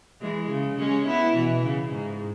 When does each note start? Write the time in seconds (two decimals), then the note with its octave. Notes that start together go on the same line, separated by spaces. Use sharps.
0.21 E3 G#3
0.50 C#3
0.79 G#3 C#4
1.07 B3 E4
1.35 B2 E3
1.64 C#3
1.92 G#2